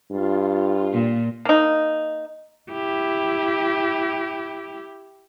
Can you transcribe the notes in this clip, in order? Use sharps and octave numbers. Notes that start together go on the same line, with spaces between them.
G2 F4
A#2
A#3 D#4
E4 G4